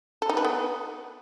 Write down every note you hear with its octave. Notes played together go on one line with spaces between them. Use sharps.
A4
D#4
B4
B3